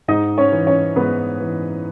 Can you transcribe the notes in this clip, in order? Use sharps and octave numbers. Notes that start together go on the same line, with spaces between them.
G#2 D#4 D#5
C#4 C#5
E3
C#4 C#5
G#2 B3 B4
E3